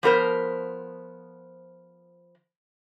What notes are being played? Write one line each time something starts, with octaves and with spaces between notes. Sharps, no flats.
F3 B3 A#4 C5